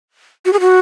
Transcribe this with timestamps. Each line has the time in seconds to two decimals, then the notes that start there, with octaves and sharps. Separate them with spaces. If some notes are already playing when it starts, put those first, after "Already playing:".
0.46 F#4
0.53 G#4
0.60 F#4